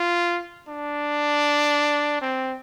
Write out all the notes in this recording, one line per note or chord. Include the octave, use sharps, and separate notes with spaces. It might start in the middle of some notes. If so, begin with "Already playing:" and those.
Already playing: F4
D4
C4